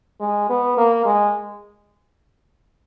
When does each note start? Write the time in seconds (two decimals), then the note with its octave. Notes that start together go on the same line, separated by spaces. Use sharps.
0.21 G#3
0.50 B3
0.77 A#3
1.06 G#3